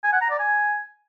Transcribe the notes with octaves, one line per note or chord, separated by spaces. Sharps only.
G#5
F#5
A#5
D5
G#5